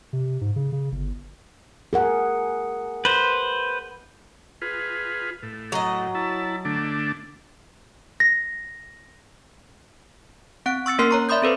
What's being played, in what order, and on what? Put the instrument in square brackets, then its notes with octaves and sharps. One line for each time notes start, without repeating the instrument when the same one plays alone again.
[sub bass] C3
G#2
C#3
C#3
G1
[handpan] G#4 A#4 F#5
[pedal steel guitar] B4 C5
[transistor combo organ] F4 G#4 B4
A2
[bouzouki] F#3 D#5
[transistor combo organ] E4 A5
D3 A3 D4
[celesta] A#6
[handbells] C4 F#5 F#6 D7
C#6 E6 A6 C#7
A#3 C#4 A#4 C6 F6 C7
C#5 A#5 C#6
D5 E5 B5 C6 D#6 G6
C4 A4 B4 C5